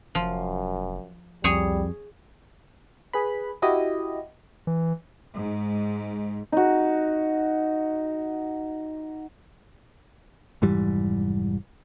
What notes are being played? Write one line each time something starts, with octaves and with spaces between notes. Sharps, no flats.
F1 F#2 F3
C2 F2 G3 G#4 C#5
G#4 B4 B5
E4 F#4 G4 D#5
E3
G#2
D#4 F#4
F1 G#2 E3 G3